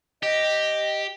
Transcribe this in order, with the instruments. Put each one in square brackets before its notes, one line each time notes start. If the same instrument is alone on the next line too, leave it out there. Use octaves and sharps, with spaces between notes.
[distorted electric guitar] G4 [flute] D#5